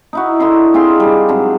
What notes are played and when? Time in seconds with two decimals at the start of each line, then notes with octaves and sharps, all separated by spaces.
0.13 D#4 E4 F#4
0.40 D3 D#4 E4 C6
0.74 C4 F4 G#4 C6
1.00 G3 D4
1.28 G#2 C3 F#3 D4